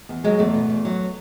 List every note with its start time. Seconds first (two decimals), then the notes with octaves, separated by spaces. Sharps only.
0.09 E2
0.24 F#3 G#3
0.39 E2 A3
0.54 B2
0.69 E2
0.85 F#3